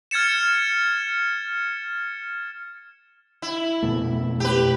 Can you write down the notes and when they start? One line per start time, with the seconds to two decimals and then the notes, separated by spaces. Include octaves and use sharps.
0.11 F6 G#6 A6 C#7 E7
3.42 E4
3.82 F2 B2 A3
4.40 G4 B4